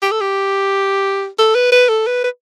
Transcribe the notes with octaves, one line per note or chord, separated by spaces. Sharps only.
G4
A4
G4
A4
B4
B4
A4
B4
B4